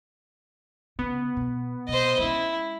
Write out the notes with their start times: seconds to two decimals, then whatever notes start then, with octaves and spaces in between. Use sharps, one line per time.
0.99 C#3 B3
1.37 B2
1.88 B2 C5 D#5
2.19 G#3 C#4 E4